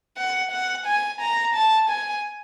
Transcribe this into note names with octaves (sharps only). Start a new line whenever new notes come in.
F#5
F#5
G#5
A#5
A5
G#5